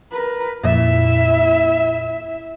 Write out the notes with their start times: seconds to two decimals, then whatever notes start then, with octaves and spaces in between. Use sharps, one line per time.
0.12 A#4 B4
0.64 F2 A#2 E4 E5